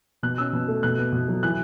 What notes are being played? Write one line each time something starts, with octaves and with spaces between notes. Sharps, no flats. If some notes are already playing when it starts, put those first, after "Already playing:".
B2 F#6
C#4 E6
B2
A3
B2 F#6
B3
B2
F#3
E3 F#6